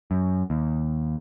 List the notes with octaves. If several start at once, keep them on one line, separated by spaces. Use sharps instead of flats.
F#2
D#2